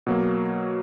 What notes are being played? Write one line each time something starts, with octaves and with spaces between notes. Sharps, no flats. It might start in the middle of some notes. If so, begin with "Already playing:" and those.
B2 F#3 A#3